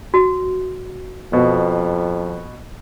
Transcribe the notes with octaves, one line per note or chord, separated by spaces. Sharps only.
F#4
F2 B2